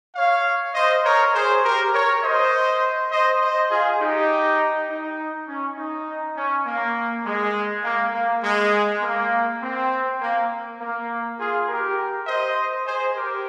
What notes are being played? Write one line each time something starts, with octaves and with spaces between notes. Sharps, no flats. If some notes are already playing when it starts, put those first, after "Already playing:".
C#5 F5
C5 D#5
A#4 C#5
G#4 C5
G4 A#4
A#4 C#5
C5 D#5
C5 D#5
C5 D#5
F4 G#4
D#4 G4
D#4
C#4
D#4
C#4
A#3
G#3
A#3
A#3
G#3
A#3
C4
A#3
A#3
F4 G#4
G4 A#4
C5 D#5
G#4 C5
G4 A#4